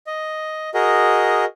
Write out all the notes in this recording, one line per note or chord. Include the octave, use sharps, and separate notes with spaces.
D#5
F#4 G#4 A#4 D#5